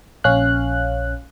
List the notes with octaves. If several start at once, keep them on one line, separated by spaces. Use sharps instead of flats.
A#1 C#4 F5 F#6